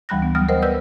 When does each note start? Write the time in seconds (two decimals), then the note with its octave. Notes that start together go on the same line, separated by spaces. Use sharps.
0.09 D2 E3 G3 B5 F#6 A#6
0.22 B3
0.35 F#3 G3 B3 D#6 F6
0.49 A#4 C5 D#5 F#5 G5
0.62 B4 D5 E6 G6